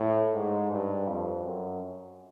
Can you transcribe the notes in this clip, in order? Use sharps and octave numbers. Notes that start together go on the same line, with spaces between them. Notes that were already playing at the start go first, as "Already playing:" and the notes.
Already playing: A2
G#2
G2
F2
F#2